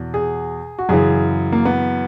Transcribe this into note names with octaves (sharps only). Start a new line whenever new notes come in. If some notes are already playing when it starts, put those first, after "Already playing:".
Already playing: E2 B2
G#4
F#4
F#2 C#3 E3 G#4
A#3
B3